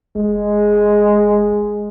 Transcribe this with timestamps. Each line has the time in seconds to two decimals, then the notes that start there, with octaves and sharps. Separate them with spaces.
0.16 F1 G#3